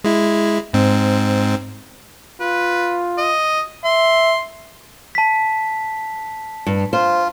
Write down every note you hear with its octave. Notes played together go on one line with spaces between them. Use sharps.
G#3 E4
G#2 C4
F4 B4
D#5
E5 C6
A5 B6
G2
F4 C5